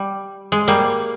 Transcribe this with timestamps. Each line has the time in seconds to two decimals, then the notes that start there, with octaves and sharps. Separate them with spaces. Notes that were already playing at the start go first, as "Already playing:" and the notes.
Already playing: G3
0.52 G#3
0.68 G3 A#3